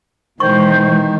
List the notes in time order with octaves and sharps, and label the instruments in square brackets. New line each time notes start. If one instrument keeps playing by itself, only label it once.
[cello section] B2 E3 G#3 [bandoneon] D#3 [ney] C5 [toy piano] C#6